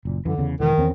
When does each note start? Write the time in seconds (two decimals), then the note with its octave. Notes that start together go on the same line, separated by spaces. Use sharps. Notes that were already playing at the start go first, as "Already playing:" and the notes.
0.05 F#1 A#2
0.25 F#2 D3 E3
0.38 E2 C#3
0.60 E1 D#3 E3
0.78 E2 C4 C#4